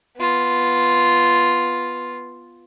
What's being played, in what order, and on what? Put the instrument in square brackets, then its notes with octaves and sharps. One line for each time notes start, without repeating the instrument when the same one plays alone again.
[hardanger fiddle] B3 F4